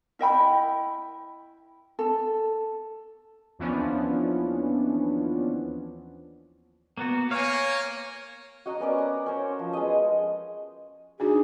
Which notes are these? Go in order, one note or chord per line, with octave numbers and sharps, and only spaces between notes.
E4 D#5 G5 B5
A4
D#2 E3 F3 B3 C#4 D4
A#3 B3 F#4
A#3 C#5 F5 G#5
F#4 D#5 F#5 A#5
B3 C#4 A#4 D5
A#5
C#4 A#4 C5 C#5
F3
G#3 B3 D#5
D4 D#4 F#4 G#4